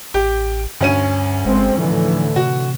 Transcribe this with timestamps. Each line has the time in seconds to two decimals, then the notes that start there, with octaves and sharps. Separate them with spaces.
0.14 A1 G4 G5
0.81 D2 G2 C#4 D#7
1.45 G1 G#3 C4
1.78 A2 D3 E3 F3
2.36 C3 F#4